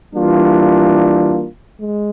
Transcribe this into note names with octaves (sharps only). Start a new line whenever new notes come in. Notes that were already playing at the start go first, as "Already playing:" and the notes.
E3 G3 A#3 D4 F4
G#3